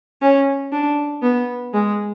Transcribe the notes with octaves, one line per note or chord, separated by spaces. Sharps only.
C#4
D4
B3
G#3